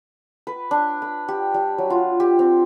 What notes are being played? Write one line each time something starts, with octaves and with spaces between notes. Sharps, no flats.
B4
D4
B5
G4
G3
F#3
F4
G4
C4